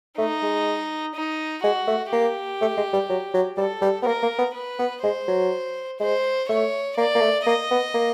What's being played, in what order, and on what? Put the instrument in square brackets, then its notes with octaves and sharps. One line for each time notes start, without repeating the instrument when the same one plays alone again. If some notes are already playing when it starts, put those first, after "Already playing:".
[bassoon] A3 [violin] D#4
[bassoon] G#3
[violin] D#4
[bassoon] G#3 [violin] F#4
[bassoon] A3
[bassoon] A#3 [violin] G4
[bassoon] A3
G#3
G3
F#3
F#3
[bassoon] G3 [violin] A4
[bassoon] G3
B3
[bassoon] A#3 [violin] A#4
[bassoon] A#3
B3
[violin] B4
[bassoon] B3
[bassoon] G#3 [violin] C5
[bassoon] F#3
[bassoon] G#3 [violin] C5
[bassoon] A3 [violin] C#5
[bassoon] A#3 [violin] D5
[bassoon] A#3
A3
[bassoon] A#3 [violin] D#5
[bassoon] B3
A#3